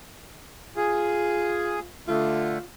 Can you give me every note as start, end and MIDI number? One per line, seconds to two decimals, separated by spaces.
0.77 1.89 65
0.77 1.80 68
2.08 2.58 50
2.08 2.58 57
2.08 2.64 65